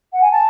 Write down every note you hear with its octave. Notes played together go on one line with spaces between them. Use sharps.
F#5
G#5
A5